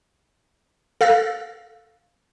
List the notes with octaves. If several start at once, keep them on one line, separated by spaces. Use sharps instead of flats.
A4 F5 E6 F#6 A6 A#6